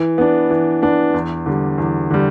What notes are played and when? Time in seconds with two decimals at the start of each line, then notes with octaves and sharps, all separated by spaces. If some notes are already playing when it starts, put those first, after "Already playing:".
Already playing: E3
0.18 B3 D4
0.50 E3
0.82 B3 D4
1.14 E2
1.46 D3 G3
1.78 E2
2.10 D3 G3